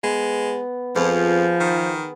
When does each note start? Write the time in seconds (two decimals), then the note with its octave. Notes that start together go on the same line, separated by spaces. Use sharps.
0.03 G#3 B3
0.96 F2 F3 B3 G#4
1.60 D#3